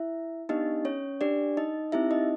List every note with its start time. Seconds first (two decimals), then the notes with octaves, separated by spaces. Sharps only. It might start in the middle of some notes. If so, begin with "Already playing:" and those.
Already playing: E4 E5
0.49 B3 D4 D#4 G4 D#5
0.85 C#4 C#5
1.21 D4 G4 D5
1.57 D#4 D#5
1.92 C4 D#4 E4 G4 E5
2.11 D#4 D#5